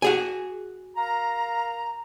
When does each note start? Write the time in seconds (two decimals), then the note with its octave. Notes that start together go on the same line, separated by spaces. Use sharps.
0.02 F#4 G#4 G#5
0.96 A#4 F5 A#5